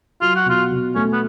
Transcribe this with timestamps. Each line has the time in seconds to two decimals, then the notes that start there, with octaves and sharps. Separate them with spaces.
0.21 F#3 F4
0.36 F#4
0.46 B2 F4
0.71 B2
0.95 A3 C#4
1.13 B3